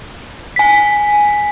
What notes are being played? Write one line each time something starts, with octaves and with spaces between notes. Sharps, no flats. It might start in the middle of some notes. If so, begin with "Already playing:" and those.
G#5 B6